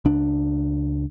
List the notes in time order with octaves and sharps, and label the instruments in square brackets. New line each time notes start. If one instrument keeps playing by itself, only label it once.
[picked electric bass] C#2 D4